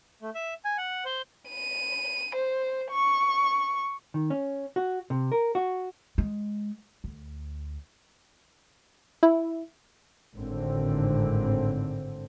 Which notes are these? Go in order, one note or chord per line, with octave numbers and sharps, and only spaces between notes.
A3
E5
G#5
F#5
C5
D#7
C5
C#6
D#3
C#4
F#4
C3
A#4
F#4
G#3
D2
E4
G#1 A2 D3 C4